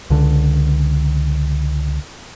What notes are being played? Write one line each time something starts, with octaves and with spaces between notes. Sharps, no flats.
C#2 D3